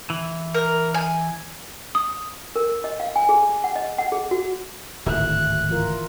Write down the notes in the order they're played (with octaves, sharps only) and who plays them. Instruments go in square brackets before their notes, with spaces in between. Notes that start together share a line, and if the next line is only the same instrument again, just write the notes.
[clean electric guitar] E3
[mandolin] A#4
G#5
[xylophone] D#6
[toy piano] A#4
D#5
F5
G#5
G#4
F#5
D#5
F#5
G#4
F#4
[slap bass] D1 G#1 [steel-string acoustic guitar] E5 [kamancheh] F#6
[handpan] E3 F4 A#4